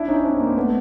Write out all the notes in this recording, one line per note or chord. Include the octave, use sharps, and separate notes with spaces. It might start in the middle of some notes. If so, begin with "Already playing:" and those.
Already playing: D4 E4
C#4 D#4
C4 D4
A#3 C4
A3 B3